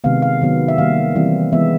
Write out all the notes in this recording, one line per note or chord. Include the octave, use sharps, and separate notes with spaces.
C3 D#3 G#3 B3 F5
F5
D#3 F#3 B3
E5
D#3 G3 A#3 F5
E3 G3 C4
E3 G#3 B3 E5